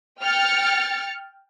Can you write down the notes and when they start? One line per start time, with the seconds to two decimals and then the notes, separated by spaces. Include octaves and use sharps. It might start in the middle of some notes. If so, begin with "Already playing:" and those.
0.22 G5 F6 A6 C#7